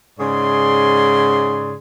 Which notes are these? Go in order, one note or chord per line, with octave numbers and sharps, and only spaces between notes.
G#2 C#3 G#4 D5 C6